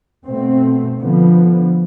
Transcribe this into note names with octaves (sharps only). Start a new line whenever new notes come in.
B2 A3 C4
D3 F3 B3